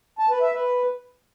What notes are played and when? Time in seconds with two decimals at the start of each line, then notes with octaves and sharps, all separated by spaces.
0.19 A5
0.30 B4
0.41 E5
0.53 B4